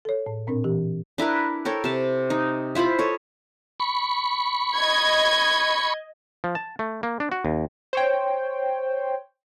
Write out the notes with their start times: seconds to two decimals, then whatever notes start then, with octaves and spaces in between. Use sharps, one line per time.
0.05 A4 C#5
0.26 A2
0.47 A#2 C4 D4 A#4
0.64 E3 G4
1.18 D4 E4 A#4 B4
1.65 A4 A#4 C#5 G5
1.84 C3 A5
2.30 D#4
2.75 E4 F4 C5 B5
2.98 A4 C#5 D#5
3.80 B5 C#6
4.78 D#5 G#6
6.44 F3
6.55 A5
6.79 A3
7.03 A#3
7.20 D4
7.32 F#4
7.45 D#2
7.93 C5 C#5 G5